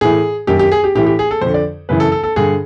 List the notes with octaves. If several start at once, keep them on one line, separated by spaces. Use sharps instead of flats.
A2 E3 G#4
F#2 D#3 G4
G4
G#4
G4
A2 E3 G4
G4
G#4
A4
F2 D3 C5
D5
F#2 C#3 E3 B4
A4
A4
A4
G2 D3 G#4